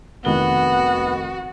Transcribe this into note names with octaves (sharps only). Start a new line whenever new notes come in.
F1 D#3 B3 F#4 G7